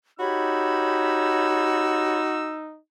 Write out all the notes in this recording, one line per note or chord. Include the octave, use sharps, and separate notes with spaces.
D#4 F#4 G4 C#5 B5 E6